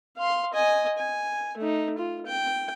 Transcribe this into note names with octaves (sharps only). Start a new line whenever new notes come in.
F5 C6
D#5 G#5
G#5
A3 D#4
F4
G5